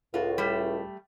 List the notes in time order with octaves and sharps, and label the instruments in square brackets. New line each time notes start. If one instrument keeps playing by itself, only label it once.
[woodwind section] C#2 A2 [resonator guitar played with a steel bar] F4 F#4
[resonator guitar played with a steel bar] G3 A3